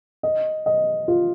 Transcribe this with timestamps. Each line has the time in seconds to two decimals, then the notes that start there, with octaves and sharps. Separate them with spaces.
0.23 D#5
0.66 D#5
1.08 F4